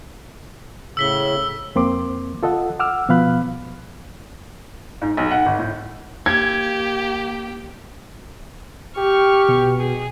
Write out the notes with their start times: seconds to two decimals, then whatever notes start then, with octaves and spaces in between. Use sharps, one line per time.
0.97 A2 C#3 E6 B6 G7
1.75 F2 A#3 C4 C6 D6
2.43 F4 A4 D#5 F#5
2.80 F#5 D6 E6 F6
3.09 B2 F3 B3 F5 B5 F#6
5.02 G#2
5.17 B1
5.31 F#5
5.46 G#1
5.59 A2
6.26 A#3 G4 G#6
8.97 G4 C#6 F6
9.48 B2
9.79 G#4